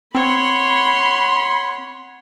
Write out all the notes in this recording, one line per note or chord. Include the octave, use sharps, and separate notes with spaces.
C4 C#5 F#5 B5 C6